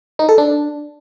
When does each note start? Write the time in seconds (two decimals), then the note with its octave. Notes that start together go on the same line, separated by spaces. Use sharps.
0.19 D#4
0.29 A4
0.38 D4